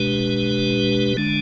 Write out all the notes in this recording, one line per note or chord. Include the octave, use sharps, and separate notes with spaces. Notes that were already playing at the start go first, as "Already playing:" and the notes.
Already playing: B2 G#3 D4 G4 B4
D3 G#3 D4